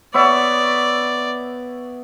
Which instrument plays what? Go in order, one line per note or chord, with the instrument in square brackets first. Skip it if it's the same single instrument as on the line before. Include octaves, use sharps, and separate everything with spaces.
[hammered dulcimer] B3 C#5 E5 [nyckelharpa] D5